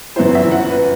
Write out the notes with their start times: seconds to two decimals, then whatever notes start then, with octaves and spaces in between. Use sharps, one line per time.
0.16 G1 F#2 E3 B3 E4 C5
0.35 E5
0.51 F#5
0.69 B4